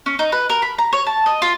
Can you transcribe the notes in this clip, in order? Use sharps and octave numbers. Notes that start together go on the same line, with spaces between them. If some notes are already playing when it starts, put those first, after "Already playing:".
C#4
D#4
B4
A#4
B5
A#5
C#5
A5
D#5
F4